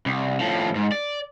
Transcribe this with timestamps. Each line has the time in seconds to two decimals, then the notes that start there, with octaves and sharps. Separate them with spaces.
0.06 C2
0.40 A2 F3
0.75 G#2
0.92 D5